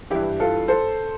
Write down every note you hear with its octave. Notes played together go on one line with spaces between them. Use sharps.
G2 E3 E4 G4
F4 A4
A4 C5